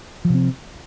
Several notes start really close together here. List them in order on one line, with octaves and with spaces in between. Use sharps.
F3 C3 C4